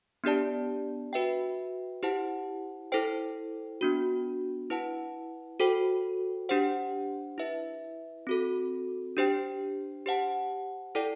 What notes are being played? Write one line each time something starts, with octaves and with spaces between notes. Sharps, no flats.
B3 D4 G4 D5 A5
F#4 B4 E5 G5
E4 G4 C5 F#5 A5
E4 A4 C5 G5
B3 D4 F#4
E4 B4 F#5 A5
F#4 A4 C5 G5
D4 G4 C5 F#5
E4 B4 E5
C4 F#4 A4
D4 G4 C5 G5
G4 C5 F#5 A5
E4 A4 D5 G5